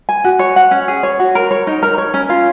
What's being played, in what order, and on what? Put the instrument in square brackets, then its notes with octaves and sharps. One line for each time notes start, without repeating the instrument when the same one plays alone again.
[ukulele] G#5
F#4
C#5
F#5
C#4
G#4
C#5
F#4
A#4
C#5
D#4
A#4
C#5
C#4
F4